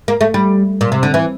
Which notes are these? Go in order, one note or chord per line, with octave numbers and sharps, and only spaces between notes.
A#3
A3
G3
A#2
C3
D3
E3